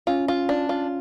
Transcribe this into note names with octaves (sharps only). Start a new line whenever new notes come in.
C#4 F4
F4
D4
F4